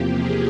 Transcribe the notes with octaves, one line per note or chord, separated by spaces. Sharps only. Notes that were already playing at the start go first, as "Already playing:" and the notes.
Already playing: E2 C3 F3 A#3 G4
G#4